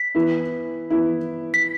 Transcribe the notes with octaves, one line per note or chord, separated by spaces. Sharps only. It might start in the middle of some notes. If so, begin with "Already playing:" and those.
Already playing: B6
E3 B3 E4
E3 B3 E4
B6